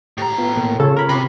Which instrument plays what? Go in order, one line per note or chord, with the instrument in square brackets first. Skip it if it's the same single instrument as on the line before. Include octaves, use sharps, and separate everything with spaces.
[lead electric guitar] A2 A#5 [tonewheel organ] G4
[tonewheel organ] B3 F4
B2 A#3
[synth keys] C#3 A4 [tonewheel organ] C#4 F4 C#5
[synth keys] A#4 B5
[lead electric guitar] C3 [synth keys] B5